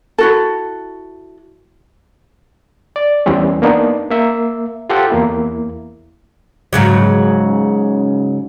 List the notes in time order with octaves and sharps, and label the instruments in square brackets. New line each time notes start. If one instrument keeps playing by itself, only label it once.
[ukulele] E4 F#4 A4
[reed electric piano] D5
E2 E3 G3 C4 C#4
A#3 B3 D4 D#4
A#3 E5
F4 G4 A4 C5 F#5 G5
E2 A#3 E4
[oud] G#2 C#3 F#3